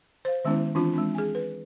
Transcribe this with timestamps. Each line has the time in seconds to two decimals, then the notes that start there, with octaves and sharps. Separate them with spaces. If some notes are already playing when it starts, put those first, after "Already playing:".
0.25 C5 F5
0.45 D#3 G#3 B3 C#4 E4
0.75 E3 C4 D4 F4
0.93 G#3 C4 D4
1.15 G#4 G#5
1.35 B4